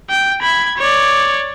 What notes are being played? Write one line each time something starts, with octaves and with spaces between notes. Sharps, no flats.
G5
B5 G#6
C#5 D5